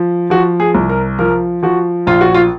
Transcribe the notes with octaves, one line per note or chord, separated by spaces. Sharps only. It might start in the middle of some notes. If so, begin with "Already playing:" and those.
Already playing: F3
F3 F#4
G#4
C2
A#4
F3 A#4
F3 F#4
A#1 F4
F#4
F4